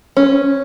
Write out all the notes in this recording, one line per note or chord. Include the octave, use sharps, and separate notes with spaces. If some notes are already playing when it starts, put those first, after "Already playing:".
C#4